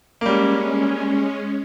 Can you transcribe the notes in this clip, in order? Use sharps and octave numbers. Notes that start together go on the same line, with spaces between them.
G3 G#3 A#3 C#4